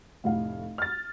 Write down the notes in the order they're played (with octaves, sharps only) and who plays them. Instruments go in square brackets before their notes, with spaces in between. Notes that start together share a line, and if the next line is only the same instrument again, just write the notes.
[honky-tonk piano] F1 A2 F5
F6 A6